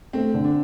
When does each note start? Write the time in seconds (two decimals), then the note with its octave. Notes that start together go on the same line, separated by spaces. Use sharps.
0.13 A3 C4
0.34 D3
0.45 D4